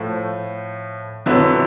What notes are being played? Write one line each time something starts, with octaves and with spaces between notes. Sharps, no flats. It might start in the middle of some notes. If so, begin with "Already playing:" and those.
Already playing: A2 F3 A3
F2 D3 F#3 B3 E4